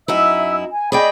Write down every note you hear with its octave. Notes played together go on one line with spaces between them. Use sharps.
F#2 D#4 E4 E5 E6
G#5
G#4 D5 D#5 G5 B5